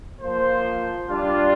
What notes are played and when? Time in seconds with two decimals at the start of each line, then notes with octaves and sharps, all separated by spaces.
0.20 F3 A#3 F4 C5
1.08 G3 D4 F4